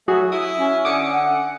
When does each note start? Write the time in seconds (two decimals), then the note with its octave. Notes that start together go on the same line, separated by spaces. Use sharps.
0.08 F#3 A3 F#4 G#4
0.32 E4 D#6
0.57 C#4
0.85 D3 D6 D#6 C#7
1.11 F#5